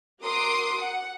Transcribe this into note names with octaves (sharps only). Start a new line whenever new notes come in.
F#4 A#4 C6 D6 D#6
F#5